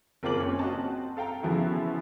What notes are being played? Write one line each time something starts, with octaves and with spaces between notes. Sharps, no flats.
F#1 A#3 C4 F4 D6 F#7
C4 C#4
F#4 D#5 A5
C4
A4 F5 G5 A#5
C#3 E3 F3 B3 E4 F#4